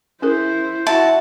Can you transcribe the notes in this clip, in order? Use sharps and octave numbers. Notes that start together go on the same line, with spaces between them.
C#4 E4 G#4 A#4 C5
E4 F#4 A5